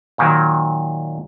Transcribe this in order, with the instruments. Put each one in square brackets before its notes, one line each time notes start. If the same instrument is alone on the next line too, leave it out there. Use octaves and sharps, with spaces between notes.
[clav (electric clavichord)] A#2 D#3 F#3